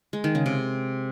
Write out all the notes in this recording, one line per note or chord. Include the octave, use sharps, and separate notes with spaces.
G#3
D#3
C#3
C3